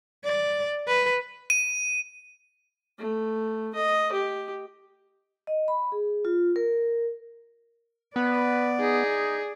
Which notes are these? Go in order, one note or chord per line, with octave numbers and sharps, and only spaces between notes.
D5
B4
D#7
A3
D#5
G4
D#5
B5
G#4
F4
A#4
B3 B4 D5
D#4 G#4